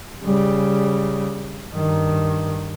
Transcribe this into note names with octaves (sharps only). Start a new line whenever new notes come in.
C#3 G3
G2 D#3